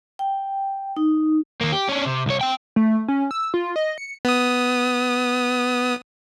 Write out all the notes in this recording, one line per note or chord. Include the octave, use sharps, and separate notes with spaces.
G5
D#4
D#3 A#3
G4
C#4 D4
C3
C2 C#5
C4 G5
A3
C#4
E6
F4
D#5
C#7
B3 D#6